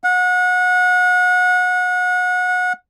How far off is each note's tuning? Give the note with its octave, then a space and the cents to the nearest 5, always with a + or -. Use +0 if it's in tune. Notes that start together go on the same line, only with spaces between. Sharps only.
F#5 -30